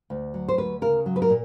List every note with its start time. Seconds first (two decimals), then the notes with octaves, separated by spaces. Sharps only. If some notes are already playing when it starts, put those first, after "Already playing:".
0.10 D2
0.34 F#3
0.48 C5
0.58 D2 B4
0.82 C#3 A#4
1.06 F#3
1.16 B4
1.22 A#4
1.30 A#2